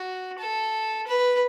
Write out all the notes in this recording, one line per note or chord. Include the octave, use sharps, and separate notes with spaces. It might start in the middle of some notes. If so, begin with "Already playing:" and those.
Already playing: F#4
A4
B4